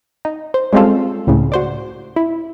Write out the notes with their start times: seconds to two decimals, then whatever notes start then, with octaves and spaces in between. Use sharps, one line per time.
0.25 D#4
0.54 C5
0.73 G3 G#3 C4 C#4 F4 A4
1.27 C#2 A2 C#3
1.52 F#4 C5 D5
2.16 E4